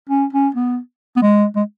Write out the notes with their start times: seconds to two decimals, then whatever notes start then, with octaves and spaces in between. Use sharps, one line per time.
0.09 C#4
0.33 C#4
0.54 B3
1.16 B3
1.22 G#3
1.56 G#3